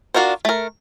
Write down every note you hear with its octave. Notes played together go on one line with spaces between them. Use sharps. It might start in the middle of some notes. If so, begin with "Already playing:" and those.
D4 F4 F#4 A#4 C5
A3 A#4